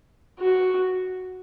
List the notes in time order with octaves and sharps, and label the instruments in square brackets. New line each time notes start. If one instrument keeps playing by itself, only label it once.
[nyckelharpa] F#4